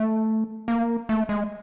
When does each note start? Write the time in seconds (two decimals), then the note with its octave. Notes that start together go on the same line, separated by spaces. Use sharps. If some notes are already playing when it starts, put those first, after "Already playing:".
Already playing: A3
0.68 A#3
1.09 A3
1.29 G#3